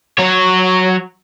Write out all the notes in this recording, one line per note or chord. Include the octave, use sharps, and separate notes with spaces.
F#3 C#5